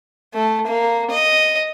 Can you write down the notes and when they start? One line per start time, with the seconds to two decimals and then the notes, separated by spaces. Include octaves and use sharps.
0.34 A3
0.67 A#3
1.11 D#5